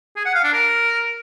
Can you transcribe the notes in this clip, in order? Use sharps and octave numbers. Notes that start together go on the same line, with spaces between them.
G#4
F#5
F5
D4
A#4